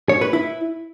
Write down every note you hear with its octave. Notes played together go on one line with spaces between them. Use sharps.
C#5
B4
E4